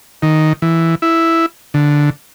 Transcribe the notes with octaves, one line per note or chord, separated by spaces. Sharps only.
D#3
E3
E4
D3